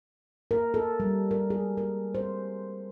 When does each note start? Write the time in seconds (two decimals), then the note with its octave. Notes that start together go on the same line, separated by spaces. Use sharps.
0.51 A#4
0.74 A4
1.00 G3
1.31 A#4
1.50 G#4
1.77 A#4
2.15 C5